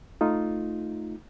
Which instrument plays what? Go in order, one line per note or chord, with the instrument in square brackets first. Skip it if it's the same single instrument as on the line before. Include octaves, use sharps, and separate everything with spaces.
[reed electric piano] A3 D#4 F4